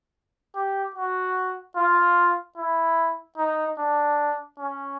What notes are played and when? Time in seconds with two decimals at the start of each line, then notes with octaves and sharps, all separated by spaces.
0.56 G4
0.96 F#4
1.76 F4
2.56 E4
3.37 D#4
3.78 D4
4.59 C#4